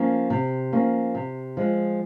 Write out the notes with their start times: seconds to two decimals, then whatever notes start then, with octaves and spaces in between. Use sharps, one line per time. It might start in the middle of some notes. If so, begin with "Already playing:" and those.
Already playing: F3 A#3 C#4
0.30 C3
0.72 F3 A#3 C#4
1.15 C3
1.57 F3 G#3